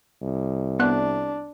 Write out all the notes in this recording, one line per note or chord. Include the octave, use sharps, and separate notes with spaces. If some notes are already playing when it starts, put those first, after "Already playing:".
C2
B3 D4 F#6